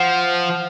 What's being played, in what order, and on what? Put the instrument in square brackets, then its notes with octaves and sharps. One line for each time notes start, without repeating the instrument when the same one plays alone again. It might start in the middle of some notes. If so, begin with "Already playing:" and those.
Already playing: [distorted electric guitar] F3 [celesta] F#5